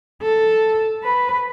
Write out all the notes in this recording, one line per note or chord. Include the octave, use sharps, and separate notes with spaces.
A4
B4